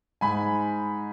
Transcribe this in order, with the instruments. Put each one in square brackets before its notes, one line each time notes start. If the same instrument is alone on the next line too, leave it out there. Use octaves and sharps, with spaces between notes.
[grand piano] G#2 G#5 B5